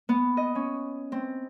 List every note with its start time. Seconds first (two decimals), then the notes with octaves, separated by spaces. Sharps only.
0.09 B3
0.37 D#5
0.55 C#4
1.12 C4